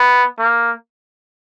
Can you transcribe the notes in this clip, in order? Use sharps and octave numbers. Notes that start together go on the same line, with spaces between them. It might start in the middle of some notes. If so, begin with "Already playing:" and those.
Already playing: B3
A#3